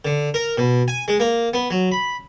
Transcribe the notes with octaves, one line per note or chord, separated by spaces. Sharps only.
D3
A#4
B2
G#5
G#3
A#3
B3
F#3
B5